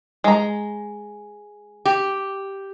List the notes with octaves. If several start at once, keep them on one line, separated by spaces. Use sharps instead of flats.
G#3 A#5
G4